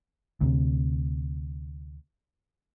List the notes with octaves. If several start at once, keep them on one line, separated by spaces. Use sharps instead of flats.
D2 C3